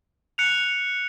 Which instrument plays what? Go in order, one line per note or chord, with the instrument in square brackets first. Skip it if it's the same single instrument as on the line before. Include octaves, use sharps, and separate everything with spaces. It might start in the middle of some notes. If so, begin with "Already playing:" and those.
[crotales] F#6 C#7 F7